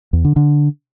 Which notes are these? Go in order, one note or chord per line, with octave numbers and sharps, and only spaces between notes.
E2
D3
D3